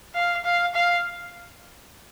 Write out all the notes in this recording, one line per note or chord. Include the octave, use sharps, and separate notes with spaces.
F5
F5
F5